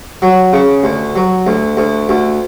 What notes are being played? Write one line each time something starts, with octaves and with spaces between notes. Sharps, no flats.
F#3
C#3
D2
F#3
D2
D2
D2